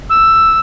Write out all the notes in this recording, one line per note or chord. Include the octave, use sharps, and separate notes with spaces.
E6